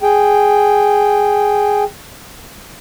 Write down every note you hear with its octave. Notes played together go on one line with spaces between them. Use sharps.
G#4 G5